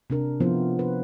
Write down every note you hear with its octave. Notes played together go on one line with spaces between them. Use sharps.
C3 D4 A#4
F3 B3 C4 E4 F4 C5
B4